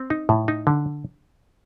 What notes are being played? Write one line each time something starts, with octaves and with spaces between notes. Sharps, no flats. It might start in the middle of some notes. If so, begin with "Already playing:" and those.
Already playing: C4
D#4
A2
D#4
D3